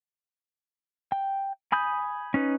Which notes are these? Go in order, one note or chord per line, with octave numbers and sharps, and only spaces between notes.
G5
G#5 B5 D#6 G6
C#4 D#4 B4